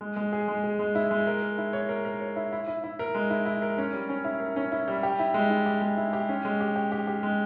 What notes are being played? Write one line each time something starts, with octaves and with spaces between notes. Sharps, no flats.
G#3
G#3
G#4
G#3
G#4
G#3
E4
G#3
A#4
A#4
E4
C#5
A#4
A#4
C#5
E4
E4
E4
E4
A#4
G#3
E4
E4
A#4
C#4
G3
C#4
E4
A#4
C#4
E4
G3
G4
E4
G#3
E4
G4
G#3
E4
G4
C#4
G#3
G4
G4
G4
G4
G#3